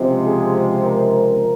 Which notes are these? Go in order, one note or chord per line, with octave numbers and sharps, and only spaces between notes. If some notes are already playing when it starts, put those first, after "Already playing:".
Already playing: C#2 C3 F3 G#3 C4
G#4
A#4